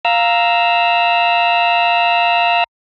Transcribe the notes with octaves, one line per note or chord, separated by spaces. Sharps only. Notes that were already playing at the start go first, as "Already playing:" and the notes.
F5 A#5 E6